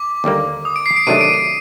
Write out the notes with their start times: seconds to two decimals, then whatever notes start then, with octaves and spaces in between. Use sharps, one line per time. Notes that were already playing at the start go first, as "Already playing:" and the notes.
Already playing: D6
0.24 D#2 D3 G3 A#3
0.65 D#6
0.76 D7
0.86 C7
0.96 D7
1.07 C3 D#3 F#3 A3 D4 D#7
1.21 D7
1.34 D#7